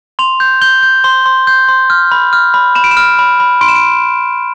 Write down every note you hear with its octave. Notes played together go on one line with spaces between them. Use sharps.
C6 F7
G6
G6 G7
G6
C6 G7
C6
G6
C6
F6
B5
F6
B5
B5 E7
D7
E7
F6
B5
B5
C6 D7
E7
D7